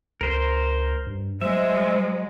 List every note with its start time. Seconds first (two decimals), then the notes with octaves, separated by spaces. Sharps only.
0.21 C#2 A#4 C5
1.07 G2
1.41 F#3 G#3 C5 E5